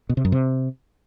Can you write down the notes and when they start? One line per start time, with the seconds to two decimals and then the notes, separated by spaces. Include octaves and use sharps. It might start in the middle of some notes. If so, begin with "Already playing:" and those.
0.09 B2
0.17 C3
0.25 F#2
0.32 C3